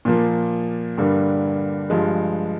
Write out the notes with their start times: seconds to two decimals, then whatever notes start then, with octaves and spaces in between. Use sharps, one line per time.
0.05 A#2 F3 A#3
0.98 G2 D3 G3 A#3
1.90 G2 F3 G#3